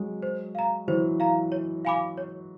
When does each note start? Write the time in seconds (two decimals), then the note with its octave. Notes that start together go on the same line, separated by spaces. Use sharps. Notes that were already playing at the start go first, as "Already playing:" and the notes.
Already playing: F#3 G#3
0.23 C5
0.55 F5 A#5
0.88 E3 F#3 C5
1.20 F5 A#5
1.52 C#5
1.85 F5 G#5 B5 D6
2.18 C#5